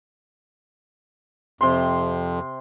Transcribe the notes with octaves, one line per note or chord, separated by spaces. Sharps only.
F2 C3 C6